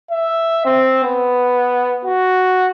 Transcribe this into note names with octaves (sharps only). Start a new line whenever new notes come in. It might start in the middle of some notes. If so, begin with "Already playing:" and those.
E5
C4
B3
F#4